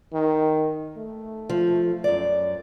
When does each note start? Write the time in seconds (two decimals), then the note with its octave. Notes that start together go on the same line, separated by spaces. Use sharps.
0.13 D#3
0.97 A3
1.50 F3
2.04 F#2 D5